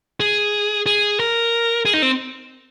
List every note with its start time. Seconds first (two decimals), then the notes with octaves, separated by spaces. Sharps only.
0.20 G#4
0.86 G#4
1.20 A#4
1.85 G#4
1.94 D#4
2.02 C4